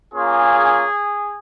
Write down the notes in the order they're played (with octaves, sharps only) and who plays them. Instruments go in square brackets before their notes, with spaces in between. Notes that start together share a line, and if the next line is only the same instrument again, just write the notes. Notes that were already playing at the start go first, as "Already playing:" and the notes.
[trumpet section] A#3 C#4 F4 G#4